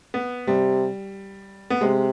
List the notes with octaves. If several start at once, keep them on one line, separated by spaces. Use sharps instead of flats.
B3
C3 G3
B3
C3 G#3